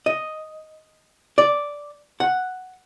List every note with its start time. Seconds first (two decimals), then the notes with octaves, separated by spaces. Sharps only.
0.06 D#5
1.38 D5
2.20 F#5